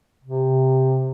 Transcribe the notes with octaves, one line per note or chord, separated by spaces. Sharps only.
C3